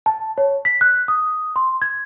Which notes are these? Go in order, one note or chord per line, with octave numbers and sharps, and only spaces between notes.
A5
C#5
B6
F#6
D#6
C6
G#6